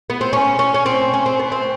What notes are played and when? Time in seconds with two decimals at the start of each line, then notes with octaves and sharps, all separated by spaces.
0.10 B3
0.21 C4
0.33 C#4
0.59 C#4
0.74 C#4
0.86 C4
1.14 C#4
1.26 C4
1.39 B3
1.52 C4